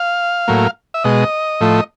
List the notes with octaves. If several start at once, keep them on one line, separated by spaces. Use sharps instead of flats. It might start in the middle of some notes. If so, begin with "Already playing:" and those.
Already playing: F5
A2 F#3 A#3
E5
B2 G#3 D#5
A2 F3 A3